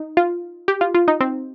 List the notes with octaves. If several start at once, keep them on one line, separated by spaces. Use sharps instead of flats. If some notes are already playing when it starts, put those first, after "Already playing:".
Already playing: D#4
F4
G4
F4
F4
D#4
C4